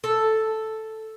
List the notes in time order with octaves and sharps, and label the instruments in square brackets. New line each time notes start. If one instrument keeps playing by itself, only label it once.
[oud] A4